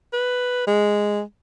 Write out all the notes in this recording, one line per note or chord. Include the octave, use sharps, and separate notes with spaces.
B4
G#3